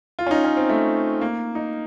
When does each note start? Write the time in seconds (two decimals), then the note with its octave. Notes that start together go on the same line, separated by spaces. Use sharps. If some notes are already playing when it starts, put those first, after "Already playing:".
0.19 F4
0.27 C#4
0.31 D#4
0.44 C#4
0.57 C4
0.69 A3
1.21 A#3
1.55 D#4